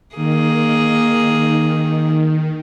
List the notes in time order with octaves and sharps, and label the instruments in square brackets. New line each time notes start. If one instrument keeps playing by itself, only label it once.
[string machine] D#3 [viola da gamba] A#3 G#4